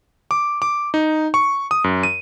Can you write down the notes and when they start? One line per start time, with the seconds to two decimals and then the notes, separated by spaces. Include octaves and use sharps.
0.31 D6
0.62 D6
0.94 D#4
1.34 C#6
1.71 D#6
1.84 F#2
2.03 D#7